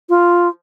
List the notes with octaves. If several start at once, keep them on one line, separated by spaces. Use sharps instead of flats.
F4